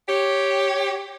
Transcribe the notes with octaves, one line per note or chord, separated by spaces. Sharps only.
G4 C#5